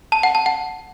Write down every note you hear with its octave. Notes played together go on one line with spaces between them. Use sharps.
A5
F#5
A5
F#5